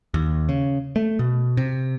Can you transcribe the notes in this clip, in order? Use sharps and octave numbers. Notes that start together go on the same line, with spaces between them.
D#2
C#3
A3
B2
C3